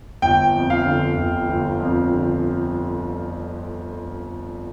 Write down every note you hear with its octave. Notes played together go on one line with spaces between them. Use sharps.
G1 G5
F2
F5
D3
G1
G1
F2
D3